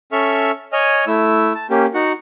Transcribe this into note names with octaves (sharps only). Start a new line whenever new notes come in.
C#4 A4 E5 C#6 F6
C#5 D#5 G#5 F6
A3 E4 E6
A5
A#3 C#4 G4
D#4 F#4 F#5